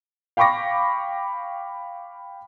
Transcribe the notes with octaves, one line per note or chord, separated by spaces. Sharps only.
F5 G5 B5 C#6 D6 A#6